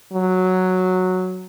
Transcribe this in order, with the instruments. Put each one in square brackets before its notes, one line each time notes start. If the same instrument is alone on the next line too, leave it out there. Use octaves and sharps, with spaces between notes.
[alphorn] F#3